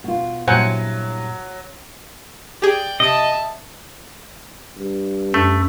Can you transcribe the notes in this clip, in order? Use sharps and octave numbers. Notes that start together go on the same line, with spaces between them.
B2 F4
G2 A#2 F#3 E4 C5 F#5 G#5
G4 G#4 D5 G5
C3 D#5 E5 A5 D7
G2
F#2 A3